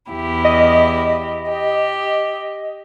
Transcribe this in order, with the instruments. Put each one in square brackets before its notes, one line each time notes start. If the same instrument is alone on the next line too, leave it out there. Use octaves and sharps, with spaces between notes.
[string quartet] E2 E4 G4
[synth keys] D#5
[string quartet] G4